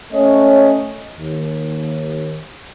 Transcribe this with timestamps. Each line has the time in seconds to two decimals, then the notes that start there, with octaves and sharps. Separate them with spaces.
0.13 A3 C#4 C#5 D#5
1.16 D#2